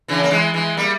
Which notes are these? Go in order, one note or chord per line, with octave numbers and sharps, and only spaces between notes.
C#3 E3
A#3
E3 G#3
E3 G#3
G3 A#3